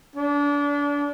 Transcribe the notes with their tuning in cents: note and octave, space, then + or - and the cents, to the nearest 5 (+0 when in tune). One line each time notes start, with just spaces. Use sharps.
D4 -30